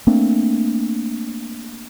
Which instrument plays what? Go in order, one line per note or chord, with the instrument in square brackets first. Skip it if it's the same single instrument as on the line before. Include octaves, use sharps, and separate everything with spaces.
[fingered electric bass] A3 A#3 C4 D4